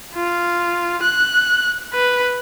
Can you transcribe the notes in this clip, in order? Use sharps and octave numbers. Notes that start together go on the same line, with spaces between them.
F4
F#6
B4